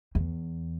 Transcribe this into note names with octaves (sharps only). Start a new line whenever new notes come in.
E2